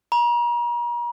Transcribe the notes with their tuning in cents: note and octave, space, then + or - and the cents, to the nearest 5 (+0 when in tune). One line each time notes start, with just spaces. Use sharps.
A#5 +40